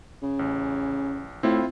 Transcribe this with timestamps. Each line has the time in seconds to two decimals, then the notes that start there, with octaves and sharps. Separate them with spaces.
0.22 C#3
0.39 A1
1.43 A2 C4 E4 F4